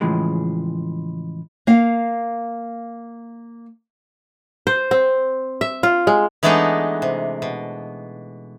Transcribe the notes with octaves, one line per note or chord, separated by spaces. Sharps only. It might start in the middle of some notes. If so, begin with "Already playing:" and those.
A2 C#3 E3 F3 G#3
A#3 F5
C5
C4
E5
F4
G#3
E3 G#3 A3 B3 D4 D#4
C3
B2